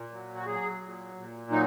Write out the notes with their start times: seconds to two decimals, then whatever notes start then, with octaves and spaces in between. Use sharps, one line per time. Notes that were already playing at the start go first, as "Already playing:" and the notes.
Already playing: A#2
0.11 F#3
0.35 F#4
0.46 F#3 G#4
0.82 A#2
1.15 A#2
1.51 F#3 D#4